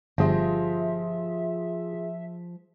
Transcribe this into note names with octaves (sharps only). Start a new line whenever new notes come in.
G1 F3 F4 G4 G#4 E5